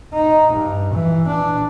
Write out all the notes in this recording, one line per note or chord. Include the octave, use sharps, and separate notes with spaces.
D#4
G2
E3
D4